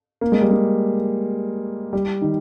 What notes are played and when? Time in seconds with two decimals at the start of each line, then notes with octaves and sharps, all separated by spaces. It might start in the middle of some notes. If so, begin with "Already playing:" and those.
0.21 A#3
0.32 G#3
0.41 G3
0.51 G#3
1.93 G3
2.22 D#3